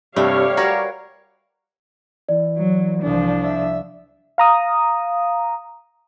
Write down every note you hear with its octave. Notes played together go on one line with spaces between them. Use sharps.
G2 C3 G3 A3 G4 C#5 F5
F#4 A#4 B4 A#5 G#6 A#6
E3 D5
F#3
C2 F3 D4
E5
F5 A#5 D#6